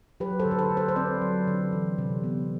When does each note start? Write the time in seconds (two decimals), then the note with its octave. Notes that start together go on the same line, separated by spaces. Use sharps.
0.20 F#3 G4 B4
0.39 A4 C5
0.45 D3
0.51 B4
0.59 A4 C5
0.71 D3
0.77 A4 C5
0.88 C5
0.96 C4 B4 D5
1.22 F#3
1.48 D3
1.72 E3
1.98 C3
2.24 B3